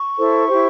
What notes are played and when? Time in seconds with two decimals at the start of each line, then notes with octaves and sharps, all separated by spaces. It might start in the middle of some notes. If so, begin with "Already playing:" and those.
Already playing: C#6
0.18 E4 A4 C5
0.48 E4 G4 C5